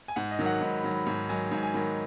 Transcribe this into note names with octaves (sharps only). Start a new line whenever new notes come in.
G#5
G#2 F#5
D#5
D#3 F#3
F#5
G#2 B5
B5
D#3 F#3
B5
G#2
D#3 F#3 G#5
G#2
G#5
D#3 F#3 B5